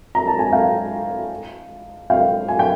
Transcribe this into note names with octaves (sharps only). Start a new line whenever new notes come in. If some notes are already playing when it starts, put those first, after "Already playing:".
A#5
A5
G#5
F5 G5
F5 G5
G#5
G5